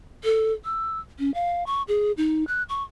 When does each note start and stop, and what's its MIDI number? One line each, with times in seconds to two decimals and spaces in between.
0.24 0.53 69
0.65 1.00 88
1.19 1.33 61
1.34 1.64 77
1.66 1.82 85
1.88 2.12 68
2.17 2.46 63
2.47 2.63 90
2.69 2.83 85